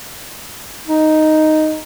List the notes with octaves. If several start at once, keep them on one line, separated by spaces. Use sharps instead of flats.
D#4